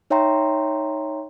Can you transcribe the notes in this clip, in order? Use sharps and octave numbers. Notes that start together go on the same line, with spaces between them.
D#4 C#5 E5 G5 A#5 C6